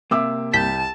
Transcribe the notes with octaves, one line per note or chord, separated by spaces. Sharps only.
C3 A#3 E5 D6 E6
C2 A5 G6 B6